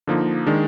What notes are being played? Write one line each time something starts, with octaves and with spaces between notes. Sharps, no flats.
D3 F3 A#3 D#4
D#3 G#3 D4